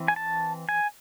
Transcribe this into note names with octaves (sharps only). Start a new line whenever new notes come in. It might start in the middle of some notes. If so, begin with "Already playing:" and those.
Already playing: E3 C4
G#5
A5
G#5